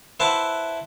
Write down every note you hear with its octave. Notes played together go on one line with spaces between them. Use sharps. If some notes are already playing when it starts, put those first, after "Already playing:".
E4 B4 C5 E5 F#5 A5